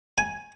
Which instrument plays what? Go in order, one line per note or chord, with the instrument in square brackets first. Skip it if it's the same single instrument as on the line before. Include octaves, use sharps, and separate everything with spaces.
[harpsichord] G#5